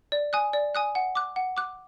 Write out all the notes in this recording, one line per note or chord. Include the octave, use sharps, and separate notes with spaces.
D5
G#5 D#6 F#6
D5
G#5 D#6 F#6
F#5
D6 F#6
F#5
D6 F#6